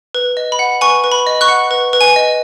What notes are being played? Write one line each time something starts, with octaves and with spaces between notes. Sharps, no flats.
B4
D#5
B5
F#5
B4 G#5 C#6
B4
B5
D#5
C#6 F#6
F#5
B4
B4
G#5
D#5